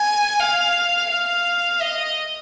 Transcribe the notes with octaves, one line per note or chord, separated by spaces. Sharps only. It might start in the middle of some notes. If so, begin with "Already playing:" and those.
Already playing: G#5
F5
F5
D#5